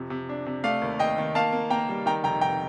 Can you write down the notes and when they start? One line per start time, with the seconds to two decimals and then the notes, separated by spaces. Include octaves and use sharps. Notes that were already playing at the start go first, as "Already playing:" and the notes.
Already playing: F2 C3
0.10 C3
0.29 D4
0.46 C3
0.64 A3 D5 F5
0.82 D#2
0.99 D#2 D#5 G5
1.18 D#3
1.35 A#3 F5 A5
1.53 A#3
1.70 A#3 G5 A#5
1.89 G3
2.06 D#3 G5 A#5
2.24 F1 G5 A#5
2.41 F1 G5 A#5